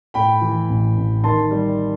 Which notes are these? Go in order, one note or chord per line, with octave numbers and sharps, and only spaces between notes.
A2 G5 B5
E3
A1
A1
D#3 A5 C6
G3